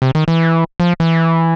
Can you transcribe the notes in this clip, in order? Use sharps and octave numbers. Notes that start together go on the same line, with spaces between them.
C3
D#3
E3
F3
E3